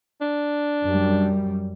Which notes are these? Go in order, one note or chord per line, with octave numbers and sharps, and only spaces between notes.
D4
F#2 G3